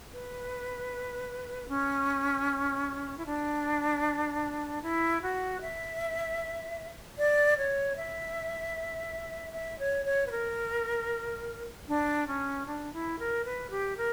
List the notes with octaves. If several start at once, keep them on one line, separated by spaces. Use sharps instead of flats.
B4
C#4
E4
D4
E4
F#4
E5
D5
C#5
E5
E5
C#5
C#5
B4
A#4
D4
C#4
D4
E4
A#4
B4
G4
A#4